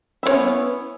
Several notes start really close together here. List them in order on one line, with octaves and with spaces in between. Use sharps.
E4 D4 C#5 C#4 B3